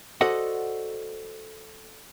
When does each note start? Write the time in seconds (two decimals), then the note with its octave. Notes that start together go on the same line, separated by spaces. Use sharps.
0.21 F#4 A4 C5 D5 D#5 F#5